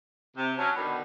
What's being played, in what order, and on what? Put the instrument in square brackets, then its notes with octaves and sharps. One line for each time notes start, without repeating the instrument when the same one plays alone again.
[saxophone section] C3
[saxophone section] F#3 C#4 [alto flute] A5
[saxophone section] B2 D3 D#3 [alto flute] B5